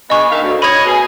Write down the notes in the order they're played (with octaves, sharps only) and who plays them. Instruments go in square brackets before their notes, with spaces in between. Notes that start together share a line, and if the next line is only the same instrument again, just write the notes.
[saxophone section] B3 D4 G#4 [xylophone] D#5 C#6
[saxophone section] D#3 E5 F5
D2
[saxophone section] C#5 D#5 [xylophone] B5 G#6
[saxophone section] B2 G#4